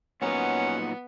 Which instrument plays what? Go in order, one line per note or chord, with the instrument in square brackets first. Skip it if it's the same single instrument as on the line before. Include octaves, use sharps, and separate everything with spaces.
[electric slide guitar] A#2 F#3 D#4 [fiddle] B3 [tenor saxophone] C#4 [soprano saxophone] F#5